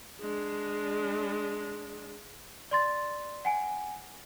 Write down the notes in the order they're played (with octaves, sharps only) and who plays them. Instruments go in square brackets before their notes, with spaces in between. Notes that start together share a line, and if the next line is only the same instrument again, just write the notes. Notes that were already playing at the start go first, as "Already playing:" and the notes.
[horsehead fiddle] G#3 D4
[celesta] D5 C6 A6
F#5 G#5 D7